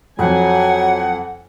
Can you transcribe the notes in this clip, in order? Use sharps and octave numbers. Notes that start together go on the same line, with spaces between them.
F2 F#3 F#5 G#5